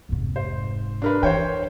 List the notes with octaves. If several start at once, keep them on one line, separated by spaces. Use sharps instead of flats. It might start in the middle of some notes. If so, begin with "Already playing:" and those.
F1 G#2
C5
D4 A#4 B4
E3 C5 C#5 G5